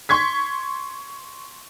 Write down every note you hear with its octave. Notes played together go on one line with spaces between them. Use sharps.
C6 C#6 G#6 B6